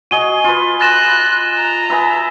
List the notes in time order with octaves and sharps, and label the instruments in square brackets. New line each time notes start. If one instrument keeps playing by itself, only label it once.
[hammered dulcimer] F#4 G#4 D#5 [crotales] D#7 G7
[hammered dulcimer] F4 B4
[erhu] F#6 [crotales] A6 A#6 E7
[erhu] A#5
[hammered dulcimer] G#4 B4 E5